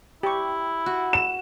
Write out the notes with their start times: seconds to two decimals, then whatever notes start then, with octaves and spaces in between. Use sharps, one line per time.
0.23 E4 G4 C#6
0.86 F#4
1.13 E7